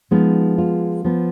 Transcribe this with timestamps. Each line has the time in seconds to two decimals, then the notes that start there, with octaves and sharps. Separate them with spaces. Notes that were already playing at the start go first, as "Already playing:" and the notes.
0.11 F3 G#3 B3 D#4
0.58 F4
1.04 F3 B3